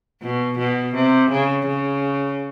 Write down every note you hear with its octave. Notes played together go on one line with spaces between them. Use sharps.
B2
B2
C3
C#3
C#3